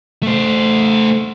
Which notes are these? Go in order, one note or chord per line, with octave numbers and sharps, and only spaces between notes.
A3 C5